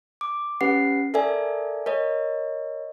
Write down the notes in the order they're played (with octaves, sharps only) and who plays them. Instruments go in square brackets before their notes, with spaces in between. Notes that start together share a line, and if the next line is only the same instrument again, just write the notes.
[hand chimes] D6
C#4 G4 B4 F#5 C7
A4 A#4 D5 E5 G#5
A#4 C#5 D#5